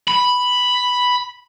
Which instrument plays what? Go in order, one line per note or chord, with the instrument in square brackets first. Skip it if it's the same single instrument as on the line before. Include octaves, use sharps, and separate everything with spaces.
[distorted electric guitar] B5